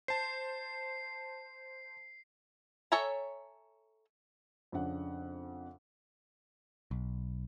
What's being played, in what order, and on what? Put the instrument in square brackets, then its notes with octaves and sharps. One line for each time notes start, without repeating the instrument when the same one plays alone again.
[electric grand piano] C5 A5 [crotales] C7
[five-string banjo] A4 C#5 E5 G#5 A#5
[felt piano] F2 C#3 D4 F#5
[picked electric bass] B1